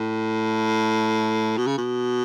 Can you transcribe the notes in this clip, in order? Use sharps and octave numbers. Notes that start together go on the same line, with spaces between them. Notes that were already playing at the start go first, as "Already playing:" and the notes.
Already playing: A2
B2
C#3
B2